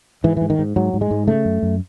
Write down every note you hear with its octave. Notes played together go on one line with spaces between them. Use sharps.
G#2 E3
G#2 E3
D#3
G#2
G#2 F#3
G#2
G#3
G#2
C#3 A3
F#2
F#2